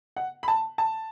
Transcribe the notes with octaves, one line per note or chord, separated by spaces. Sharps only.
F#5
B5
A5
A5